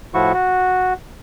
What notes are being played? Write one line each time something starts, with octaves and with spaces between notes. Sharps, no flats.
A2 F3 E4 F#4 C#6
F#4